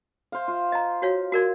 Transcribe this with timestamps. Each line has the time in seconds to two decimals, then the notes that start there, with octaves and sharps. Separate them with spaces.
0.32 C5 F5
0.48 F4
0.72 D#5 A#5
1.02 F#4 C#5 F5
1.32 F#4 A#4 D5